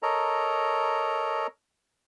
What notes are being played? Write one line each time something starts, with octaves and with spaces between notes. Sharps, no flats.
A4 A#4 C#5 D#5 A#5